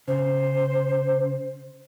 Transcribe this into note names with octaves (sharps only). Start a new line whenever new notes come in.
C#3 C5